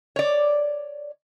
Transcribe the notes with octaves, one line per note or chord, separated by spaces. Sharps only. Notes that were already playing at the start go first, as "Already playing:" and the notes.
C#5 D5